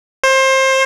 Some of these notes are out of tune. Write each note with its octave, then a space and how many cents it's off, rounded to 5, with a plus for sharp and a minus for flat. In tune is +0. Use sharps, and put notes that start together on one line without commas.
C5 +25